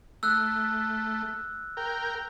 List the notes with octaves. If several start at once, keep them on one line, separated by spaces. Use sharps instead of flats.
A3 E6 F#6
A#4 G5